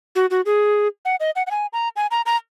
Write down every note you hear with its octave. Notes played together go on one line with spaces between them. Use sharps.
F#4
F#4
G#4
F#5
D#5
F#5
F#5
G#5
A#5
G#5
A#5
A#5